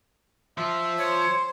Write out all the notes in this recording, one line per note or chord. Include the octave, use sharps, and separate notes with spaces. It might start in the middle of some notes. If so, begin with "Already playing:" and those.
F3 F4 E5
C5 C#5